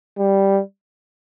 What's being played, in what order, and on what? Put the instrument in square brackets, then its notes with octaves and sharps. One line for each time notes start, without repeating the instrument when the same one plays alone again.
[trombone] G3